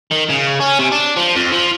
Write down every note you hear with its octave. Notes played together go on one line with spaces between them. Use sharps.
D#3
C#3
C#4
C3
D4
F3
F2
F3